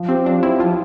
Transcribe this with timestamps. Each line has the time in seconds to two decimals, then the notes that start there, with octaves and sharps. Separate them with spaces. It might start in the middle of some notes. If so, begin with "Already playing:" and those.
Already playing: F3
0.09 C4 G4
0.25 F3 D4
0.43 C4 E4
0.60 F3 F4